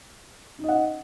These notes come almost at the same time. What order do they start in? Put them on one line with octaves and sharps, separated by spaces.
D#4 D#5 F#5